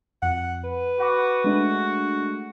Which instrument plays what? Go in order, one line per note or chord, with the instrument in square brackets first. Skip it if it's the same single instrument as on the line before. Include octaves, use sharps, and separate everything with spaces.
[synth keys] F2 [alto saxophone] F#5
[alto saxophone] B4
[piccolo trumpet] F#4 [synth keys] F#5 B5 D6
[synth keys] G#3 A3 D4